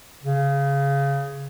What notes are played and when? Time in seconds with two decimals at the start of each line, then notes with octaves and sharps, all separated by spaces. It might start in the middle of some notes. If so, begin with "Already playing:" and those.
0.23 C#3